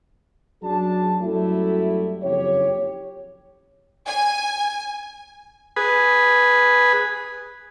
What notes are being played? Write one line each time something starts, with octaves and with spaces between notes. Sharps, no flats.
F#2 F#3 D4 G#4 A5
F#2 F#3 G3 A3 E4 G4
F#1 F2 G4 C#5
G#5
G#4 B4